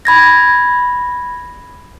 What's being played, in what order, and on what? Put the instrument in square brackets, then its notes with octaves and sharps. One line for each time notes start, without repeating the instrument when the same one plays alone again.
[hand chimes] B5 G#6 A#6